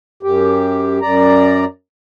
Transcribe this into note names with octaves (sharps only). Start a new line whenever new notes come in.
F#2 G4
F#2 D5 A#5